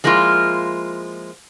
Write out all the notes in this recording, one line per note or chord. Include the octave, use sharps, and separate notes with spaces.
F3 G#3 A#3 E4 F4